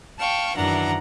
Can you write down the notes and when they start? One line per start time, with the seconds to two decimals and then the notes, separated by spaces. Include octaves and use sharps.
0.18 F5 G5 A5 C#6
0.56 F#2 D#3 E3 D4 F#5 A#5